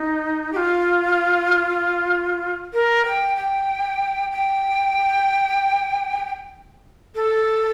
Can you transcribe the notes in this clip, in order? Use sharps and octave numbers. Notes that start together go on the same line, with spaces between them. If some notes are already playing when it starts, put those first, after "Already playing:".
Already playing: D#4
G4
F4
A#4
G5
G5
G5
A4